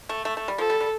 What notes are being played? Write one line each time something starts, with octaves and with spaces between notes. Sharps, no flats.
A3
A3
A3
G3
F3 A4
G3
G3